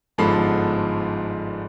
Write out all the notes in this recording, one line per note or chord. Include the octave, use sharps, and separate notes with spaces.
G1 G#2 F3 A4 B5 C7